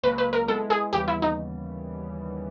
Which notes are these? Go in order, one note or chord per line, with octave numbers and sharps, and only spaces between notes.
C#2 C#3 F#3 A#3 B4
B4
A#4
G#3 B3 E4 A4
G#4
D#2 C#3 E3 G3 B3 G4
E4
D#4